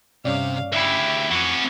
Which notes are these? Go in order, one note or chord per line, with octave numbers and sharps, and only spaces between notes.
G2 C3 C#4 D5 F5
D2 C#3 E4 G4 E5
F2 E3 C4 C#4 F#4 F#5